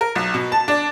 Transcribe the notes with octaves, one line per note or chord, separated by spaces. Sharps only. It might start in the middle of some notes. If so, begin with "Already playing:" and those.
A#4
B1
B2
A5
D4